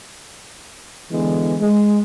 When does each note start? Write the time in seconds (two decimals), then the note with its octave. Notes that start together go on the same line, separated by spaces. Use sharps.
1.11 D3 E3 G#3 B3
1.59 G#3